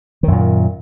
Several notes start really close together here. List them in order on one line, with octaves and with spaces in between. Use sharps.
D#3 F#2 A#2